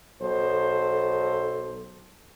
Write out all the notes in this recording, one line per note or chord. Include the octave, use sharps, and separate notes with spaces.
B1 A4 C5